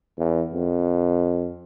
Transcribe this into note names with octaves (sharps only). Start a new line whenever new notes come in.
E2
F2